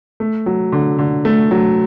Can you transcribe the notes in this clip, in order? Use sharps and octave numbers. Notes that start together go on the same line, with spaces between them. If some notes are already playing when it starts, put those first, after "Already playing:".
A3
F#3
D3
D3
A3
F#3